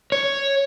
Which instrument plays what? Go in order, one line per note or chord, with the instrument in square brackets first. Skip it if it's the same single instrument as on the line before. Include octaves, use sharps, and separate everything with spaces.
[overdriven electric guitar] C#5